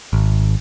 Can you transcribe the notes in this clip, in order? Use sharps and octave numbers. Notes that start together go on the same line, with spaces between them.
G#1